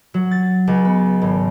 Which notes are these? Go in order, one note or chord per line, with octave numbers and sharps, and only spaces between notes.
F#3
A6
C#2
B3
G#1